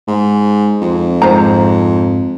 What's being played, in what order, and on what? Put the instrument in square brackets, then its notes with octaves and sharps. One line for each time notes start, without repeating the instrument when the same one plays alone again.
[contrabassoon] G#2
F2
[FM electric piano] G#2 [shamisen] C5 A#5